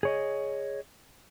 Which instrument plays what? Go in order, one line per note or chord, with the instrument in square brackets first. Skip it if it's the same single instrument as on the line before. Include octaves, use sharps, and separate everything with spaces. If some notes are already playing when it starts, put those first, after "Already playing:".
[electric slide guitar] G#4 C#5 D#5